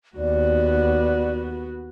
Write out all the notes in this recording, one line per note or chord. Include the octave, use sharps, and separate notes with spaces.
D#2 B3 F#4 D5